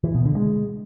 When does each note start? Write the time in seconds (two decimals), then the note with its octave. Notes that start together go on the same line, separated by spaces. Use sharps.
0.04 E3
0.15 B2
0.26 D3
0.36 G#3